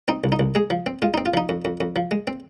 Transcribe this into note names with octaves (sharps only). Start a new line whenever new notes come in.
C4 D#4
C2
D#4
C2
G#3 G#4
F3
C4
G#3 F4
C4 D#4
F4
F3 D#4
F2
F2
F2
F3
G#3
C4